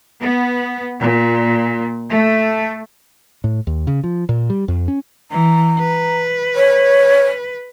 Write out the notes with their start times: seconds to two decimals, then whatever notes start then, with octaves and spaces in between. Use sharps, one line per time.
0.21 B3
1.01 A#2
2.11 A3
3.44 A2
3.67 D#2
3.87 C#3
4.04 F3
4.29 A#2
4.50 G3
4.68 F2
4.88 C#4
5.31 E3 A#5
5.79 B4
6.56 C#5